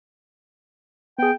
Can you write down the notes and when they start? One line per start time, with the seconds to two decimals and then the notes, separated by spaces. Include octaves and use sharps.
1.19 B3 G#4 G5